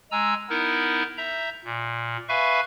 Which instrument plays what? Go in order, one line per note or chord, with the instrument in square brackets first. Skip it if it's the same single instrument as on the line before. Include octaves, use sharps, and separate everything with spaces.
[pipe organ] G#3 G#5 A#5 E6
B3 D#4 E4 A#4
E5 A#5 G6
A#2
B4 E5 F5 G#5 B5 C#6